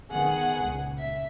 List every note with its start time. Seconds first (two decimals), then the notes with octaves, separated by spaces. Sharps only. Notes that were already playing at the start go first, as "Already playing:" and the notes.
0.11 D#3 B3 G#4 F#5
0.57 C#2 A#2
0.98 E5